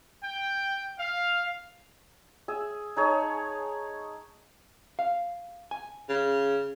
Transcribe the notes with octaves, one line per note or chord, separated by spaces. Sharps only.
G5
F5
G#4 E5
D#4 G#4 C#5 A5
F5
G#5
C#3